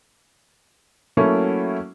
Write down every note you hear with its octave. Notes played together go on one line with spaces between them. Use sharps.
F#3 A3 A#3 C#4 E4 F#4